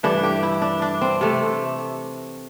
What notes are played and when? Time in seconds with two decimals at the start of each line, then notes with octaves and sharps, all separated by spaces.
0.03 G2 E3 A3 D4
0.23 G4
0.43 E4
0.62 D4
0.82 D4
1.01 C4
1.21 C3 A3